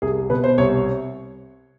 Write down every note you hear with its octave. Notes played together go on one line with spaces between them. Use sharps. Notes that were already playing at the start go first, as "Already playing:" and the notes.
C2 G#4
B2 B4
C5
C2 C#5